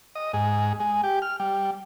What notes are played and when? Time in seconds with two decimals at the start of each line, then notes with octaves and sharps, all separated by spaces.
0.15 D#5
0.33 G#2
0.80 G#3
1.03 G4
1.22 F6
1.40 G3